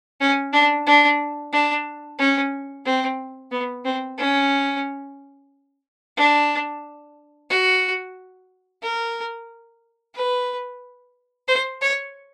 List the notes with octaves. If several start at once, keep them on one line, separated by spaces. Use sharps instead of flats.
C#4
D4
D4
D4
C#4
C4
B3
C4
C#4
D4
F#4
A#4
B4
C5
C#5